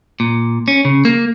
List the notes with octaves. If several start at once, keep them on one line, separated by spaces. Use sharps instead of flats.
A#2
C#4
C#3
A#3